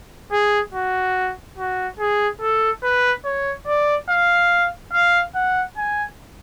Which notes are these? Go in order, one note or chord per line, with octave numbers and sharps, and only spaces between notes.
G#4
F#4
F#4
G#4
A4
B4
C#5
D5
F5
F5
F#5
G#5